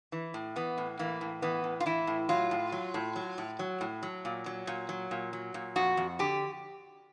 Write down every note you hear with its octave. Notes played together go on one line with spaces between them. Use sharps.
E3
A2
E3 B3
A2
E3 A#3
A2
E3 B3
A2
F4
E3 E4
A2
F#3 F4
A2
F#3
A2
F#3
A2
F#3
A2
F#3
A#2
F#3
A#2
F#3
A#2
F#3
A#2
F2 F#4
F2
D3 G4